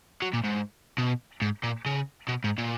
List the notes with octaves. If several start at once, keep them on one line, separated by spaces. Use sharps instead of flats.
F#3
A#2
G#2
B2
G#2
A#2
C#3
B2
G#2
A#2